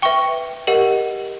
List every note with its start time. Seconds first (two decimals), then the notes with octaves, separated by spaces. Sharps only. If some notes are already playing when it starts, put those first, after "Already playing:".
0.02 B4 E5 G5 C#6
0.67 G4 A#4 D#5 F#5